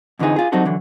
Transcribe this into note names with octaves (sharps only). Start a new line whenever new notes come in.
F2 D3 E3 F3 D#4 G#4
F4 G#4
F#3 G3 C4 D#4 F#4 A4
D3 E3 F#3